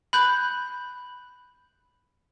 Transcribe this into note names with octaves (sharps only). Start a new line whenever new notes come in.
B5 F#6 G6